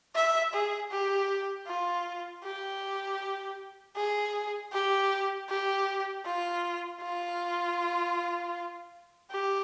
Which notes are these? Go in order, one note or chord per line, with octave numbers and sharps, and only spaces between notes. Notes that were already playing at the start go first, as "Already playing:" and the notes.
E5
G#4
G4
F4
G4
G#4
G4
G4
F4
F4
G4